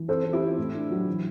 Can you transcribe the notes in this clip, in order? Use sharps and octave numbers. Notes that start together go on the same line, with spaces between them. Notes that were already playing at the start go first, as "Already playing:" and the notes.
Already playing: E3
C4 A4 C5
C4
E4 G4
C4
A2
D4
F#3
E3